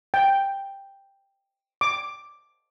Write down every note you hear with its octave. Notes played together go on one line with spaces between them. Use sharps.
G5
D6